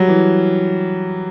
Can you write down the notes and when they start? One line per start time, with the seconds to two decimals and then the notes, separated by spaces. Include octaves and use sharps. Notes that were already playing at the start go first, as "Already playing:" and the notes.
Already playing: F#3 G3
0.08 E3